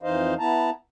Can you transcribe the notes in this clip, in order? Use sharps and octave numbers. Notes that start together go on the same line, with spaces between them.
F2 E3 D#4 C5 D#5 F5
B3 E4 A5 A#5